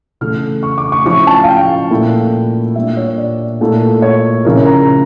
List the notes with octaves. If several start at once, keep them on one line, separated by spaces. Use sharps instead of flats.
C#3 E3 A3 F6
C#6
D6
C#6
F3 C#4 E4 C#6
A5
F5
G5
A#2 A3 E4
A#2 G3 D4 E5
C#5
D5
A#2 A3 E4
C#5
C#3 F3 C#4 E4 A#4
C#5
A#5